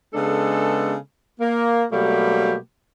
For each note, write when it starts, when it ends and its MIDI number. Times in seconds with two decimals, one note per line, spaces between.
0.14 0.95 49
0.14 0.95 56
0.14 0.95 59
0.14 0.95 62
0.14 0.95 69
1.40 1.84 58
1.92 2.55 47
1.92 2.55 54
1.92 2.55 55
1.92 2.55 57
1.92 2.55 58
1.92 2.55 67